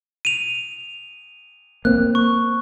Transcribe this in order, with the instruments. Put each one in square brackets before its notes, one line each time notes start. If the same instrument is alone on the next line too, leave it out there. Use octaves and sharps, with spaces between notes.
[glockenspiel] D#7 F7
[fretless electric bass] A#3 C4 [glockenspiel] F#6
[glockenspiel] C#6